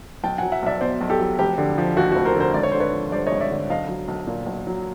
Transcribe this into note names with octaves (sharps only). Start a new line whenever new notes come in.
B1 G5 A5
F#3 F#5 G#5
E5 F#5
B1 D5 E5
B2 C5 D5
B1
G4 A4
F#3
F1 G4
D3
F3
D#2 F#4
F1 F#4
A#4 C5
D3 A#4 C5
G#1 D5
C#5
D3 C5
B4 C#5
F3
G2 C5 D5
C#5 D#5
G#1
D5 E5
D3
B1 D#5 F5
F#3
B1
A#2
B1
F#3